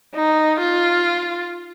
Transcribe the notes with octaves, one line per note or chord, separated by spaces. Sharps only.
D#4
F4